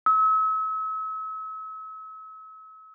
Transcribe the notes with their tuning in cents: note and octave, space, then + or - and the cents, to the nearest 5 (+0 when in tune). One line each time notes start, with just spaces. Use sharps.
E6 -40